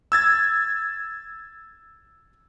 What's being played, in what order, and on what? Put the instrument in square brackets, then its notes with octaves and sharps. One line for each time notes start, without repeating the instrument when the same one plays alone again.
[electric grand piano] E6 G#6 A6